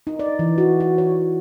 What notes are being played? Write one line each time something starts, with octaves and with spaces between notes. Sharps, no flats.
D#4
D5
E3
F#4
F#4
C#5